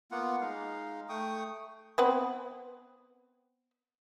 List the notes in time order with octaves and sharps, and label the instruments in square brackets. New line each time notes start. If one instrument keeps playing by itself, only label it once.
[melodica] A#3 B3 F4 F#5
G#3 D#4 F5
A3 G5 C#6 D#6
[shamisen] B3 C4 B4